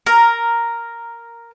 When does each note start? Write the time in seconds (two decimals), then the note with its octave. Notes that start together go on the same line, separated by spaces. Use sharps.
0.06 A#4